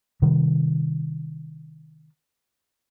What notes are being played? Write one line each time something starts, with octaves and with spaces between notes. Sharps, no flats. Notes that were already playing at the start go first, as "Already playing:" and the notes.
C3 D#3 G3